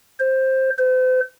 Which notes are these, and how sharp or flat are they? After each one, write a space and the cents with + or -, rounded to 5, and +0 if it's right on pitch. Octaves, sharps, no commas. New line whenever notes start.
C5 +10
C5 -40